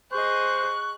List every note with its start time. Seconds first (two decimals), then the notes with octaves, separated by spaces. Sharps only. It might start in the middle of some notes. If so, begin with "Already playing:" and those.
0.12 G#4 C5 D#5 C#6 F#6